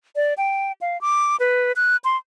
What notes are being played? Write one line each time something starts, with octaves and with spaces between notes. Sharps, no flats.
D5
G5
F5
D6
B4
F#6
C6